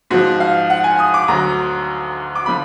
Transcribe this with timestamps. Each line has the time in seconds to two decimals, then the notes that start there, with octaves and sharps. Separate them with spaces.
0.10 G#2 F3 F#4
0.40 F5
0.70 F#5
0.84 G#5
0.99 D#6
1.14 D6
1.28 D2 D3 F#3 A#5
2.35 D6
2.46 D3 F3 B5